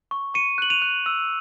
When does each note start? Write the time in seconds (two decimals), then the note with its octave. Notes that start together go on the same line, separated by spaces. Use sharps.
0.11 C#6
0.34 C#6 C#7 D#7
0.58 F#6 F#7
0.70 D#7 F7
0.82 F#6
1.06 E6